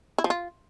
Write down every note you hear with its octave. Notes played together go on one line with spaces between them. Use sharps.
E4
F3
F4